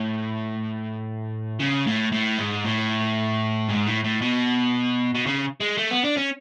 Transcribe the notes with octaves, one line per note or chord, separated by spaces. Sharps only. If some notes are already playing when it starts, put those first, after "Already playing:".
Already playing: A2
C#3
A2
A2
G#2
A2
G#2
A2
A2
B2
B2
C#3
G#3
A3
B3
D4
C#4